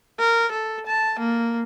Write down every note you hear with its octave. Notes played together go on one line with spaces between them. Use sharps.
A#4
A4
A5
A#3